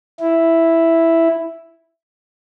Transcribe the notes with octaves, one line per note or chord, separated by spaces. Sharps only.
E4